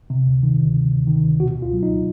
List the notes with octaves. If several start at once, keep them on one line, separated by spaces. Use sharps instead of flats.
C3
D2
D#3
D2
C3
D2
D#3
D2
B2 F#4
C#2
F4
F#3
D#4